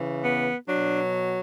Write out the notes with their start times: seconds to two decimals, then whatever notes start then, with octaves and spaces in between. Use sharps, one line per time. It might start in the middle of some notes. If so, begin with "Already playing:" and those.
Already playing: C#3 E3
0.23 B3
0.68 B2 F#3 D4